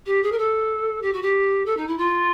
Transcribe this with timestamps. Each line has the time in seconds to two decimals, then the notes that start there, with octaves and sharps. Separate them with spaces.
0.06 G4
0.23 G#4
0.32 A#4
0.38 A4
1.02 G4
1.13 F#4
1.22 G4
1.66 A4
1.77 D#4
1.87 E4
1.98 F4